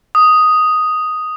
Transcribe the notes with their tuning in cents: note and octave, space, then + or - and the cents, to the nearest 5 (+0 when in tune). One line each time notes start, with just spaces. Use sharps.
D#6 +0